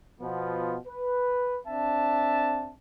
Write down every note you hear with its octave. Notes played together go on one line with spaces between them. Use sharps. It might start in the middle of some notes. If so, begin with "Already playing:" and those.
B2 F3 B3 F4
B4
C4 D4 E5 A5